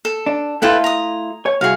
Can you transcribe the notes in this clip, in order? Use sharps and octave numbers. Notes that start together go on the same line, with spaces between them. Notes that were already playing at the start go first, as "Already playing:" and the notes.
A4
D4
A3 E4 F4 A4 B4 G5
A#5 D#6
C#5
C2 F#4 G#4 F5